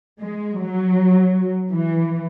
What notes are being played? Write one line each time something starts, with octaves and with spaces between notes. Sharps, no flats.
G#3
F#3
E3